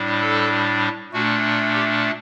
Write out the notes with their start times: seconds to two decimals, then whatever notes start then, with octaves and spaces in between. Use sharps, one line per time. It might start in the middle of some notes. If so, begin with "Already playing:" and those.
Already playing: A2 G3 D4
0.21 A4
1.13 A#2 A3 D4 F#4
1.75 G4